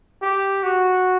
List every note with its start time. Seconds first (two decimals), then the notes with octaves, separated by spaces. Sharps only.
0.22 G4
0.63 F#4